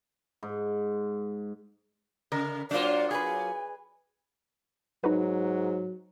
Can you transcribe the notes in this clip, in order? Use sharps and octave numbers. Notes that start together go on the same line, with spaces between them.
G#2
C#3 A#4
F#3 A#3 D4 F4 C5 D5
G#4 B4 G#5
G#2 F#3 D#4 F#4 B4